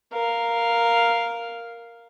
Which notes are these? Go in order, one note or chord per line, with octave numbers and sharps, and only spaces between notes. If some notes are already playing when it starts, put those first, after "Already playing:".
A#4 F5